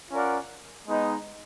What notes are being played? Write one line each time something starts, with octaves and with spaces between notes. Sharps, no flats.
C#4 F4 A#4 D5 F#5
G#3 B3 D#4